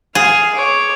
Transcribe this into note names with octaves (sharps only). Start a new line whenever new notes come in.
G#4 F5
C#5 D6